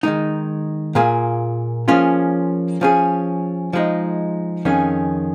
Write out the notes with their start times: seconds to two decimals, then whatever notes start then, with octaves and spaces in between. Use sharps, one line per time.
0.03 D#3 G#3 D#4
0.95 A#2 A#3 F4 G#4
1.88 F3 A#3 C#4 F4 G#4
2.81 F3 C#4 G#4
3.73 F3 G#3 D#4
4.65 F2 D#3 C#4 G#4